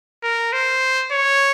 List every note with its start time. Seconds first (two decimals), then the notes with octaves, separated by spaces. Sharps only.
0.23 A#4
0.53 C5
1.12 C#5